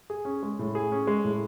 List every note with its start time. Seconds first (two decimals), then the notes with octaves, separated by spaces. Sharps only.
0.10 G#4
0.25 C#4
0.43 G#3
0.59 A2
0.75 G#4
0.92 C#4
1.07 G#3
1.24 A2